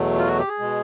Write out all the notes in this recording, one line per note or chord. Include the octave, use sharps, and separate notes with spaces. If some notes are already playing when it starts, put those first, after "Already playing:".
Already playing: E2 B2 F#3 A3
F4
F#4
G4
G#4
B2 G#3